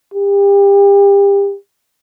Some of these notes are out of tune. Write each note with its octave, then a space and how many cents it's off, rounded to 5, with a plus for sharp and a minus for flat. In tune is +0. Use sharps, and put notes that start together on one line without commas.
G4 +30